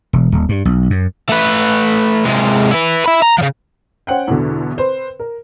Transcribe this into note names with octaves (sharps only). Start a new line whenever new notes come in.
E1
D#1
G2
B1
F#2
A3 B4
C3 G#3
E4 B4
E5 B5
A#5
C#3 F3
C#4 C5 F#5 G5
E2 B2 D3
C4 B4 C5
A#4